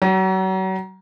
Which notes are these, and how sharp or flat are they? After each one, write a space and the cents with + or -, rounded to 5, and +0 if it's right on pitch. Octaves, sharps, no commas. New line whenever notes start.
F#3 +35